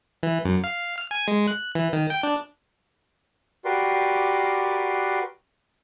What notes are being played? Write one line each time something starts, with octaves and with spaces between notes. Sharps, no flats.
E3
F#2
F5
F6
G#5
G#3
F#6
E3
D#3
G5
D4
F#4 G4 A#4 B4 D5 C6